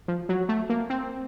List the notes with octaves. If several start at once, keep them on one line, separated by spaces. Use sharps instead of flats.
F3
F#3
A3
A#3
C4